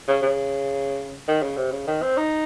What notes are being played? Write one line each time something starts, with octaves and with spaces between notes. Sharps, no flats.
C#3
C#3
D#3
C#3
C3
C#3
D#3
C4
D#4